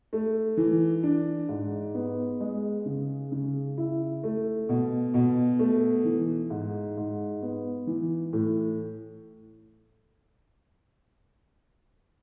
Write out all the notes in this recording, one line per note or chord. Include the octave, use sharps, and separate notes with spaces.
A3
E3
D4
G#2
B3
G#3
C#3
C#3
E4
A3
B2
B2
A3
E3
G#2
G#2
B3
E3
A2